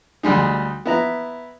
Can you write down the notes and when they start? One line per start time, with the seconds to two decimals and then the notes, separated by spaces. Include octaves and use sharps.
0.23 D2 G3 G#3 D#4
0.85 B3 E4 A#5